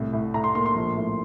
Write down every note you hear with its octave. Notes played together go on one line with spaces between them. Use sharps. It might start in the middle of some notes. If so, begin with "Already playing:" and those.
Already playing: C2 A2
A2
A2 A#5
C6
A#3 C6
C6
A#1
A2